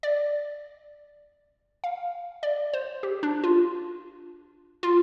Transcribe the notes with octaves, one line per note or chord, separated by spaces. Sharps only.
D5
F5
D5
C5
G4
D4
F4
F4